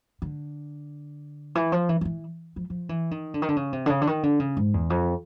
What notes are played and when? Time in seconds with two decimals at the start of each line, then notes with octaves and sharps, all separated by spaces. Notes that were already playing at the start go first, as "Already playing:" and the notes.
0.22 D3
1.55 E3
1.72 F3
1.89 E3
2.01 F3
2.05 E3
2.56 F3
2.70 F3
2.89 E3
3.11 D#3
3.34 D3
3.42 D#3
3.48 D3
3.56 C#3
3.73 C3
3.86 D3
3.90 C#3
4.01 D3
4.07 D#3
4.23 D3
4.40 C#3
4.57 G#2
4.74 E2
4.90 F2